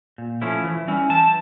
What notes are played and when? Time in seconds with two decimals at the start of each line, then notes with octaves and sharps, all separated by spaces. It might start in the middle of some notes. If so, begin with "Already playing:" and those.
0.18 A#2
0.42 F3 A3 C#4 E4
0.64 E3
0.88 G3 C#4 E4
1.10 E3 A5